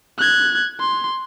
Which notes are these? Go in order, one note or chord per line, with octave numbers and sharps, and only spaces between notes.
F#6 G#6
C6